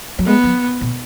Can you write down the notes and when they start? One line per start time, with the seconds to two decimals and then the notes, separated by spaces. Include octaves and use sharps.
0.19 F#3
0.26 G#3 B3
0.44 F#3
0.81 A#2